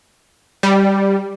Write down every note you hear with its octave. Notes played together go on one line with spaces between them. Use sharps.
G3